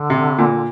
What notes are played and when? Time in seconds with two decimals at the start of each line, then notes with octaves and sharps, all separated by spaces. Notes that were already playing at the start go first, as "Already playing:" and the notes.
Already playing: D3
0.10 C3
0.38 A#2